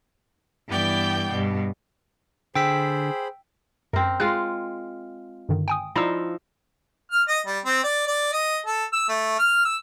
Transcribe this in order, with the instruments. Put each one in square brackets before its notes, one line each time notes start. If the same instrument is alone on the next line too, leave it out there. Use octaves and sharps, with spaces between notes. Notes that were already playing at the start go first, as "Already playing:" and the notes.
[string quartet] G2 E3 B3 D5 G5 G6
G2 B2
[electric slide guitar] D3 [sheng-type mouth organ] G#4 C5 B5 [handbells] G5 E6 B6
[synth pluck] F#2 [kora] C4 A#4
[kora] G#3 F4 [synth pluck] F#6
[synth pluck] G2 D3 D#3
G5 G#5 D#6
[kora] F3 D#4 E4 [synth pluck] D5 A#5 E6
[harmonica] F6
D#5
G3
C4
D5
D5
D#5
A4
E6
A3
F6
E6